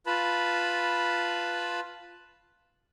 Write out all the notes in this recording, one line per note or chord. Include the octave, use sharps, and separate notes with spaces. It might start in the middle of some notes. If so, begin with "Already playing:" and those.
F4 B4 A5 B5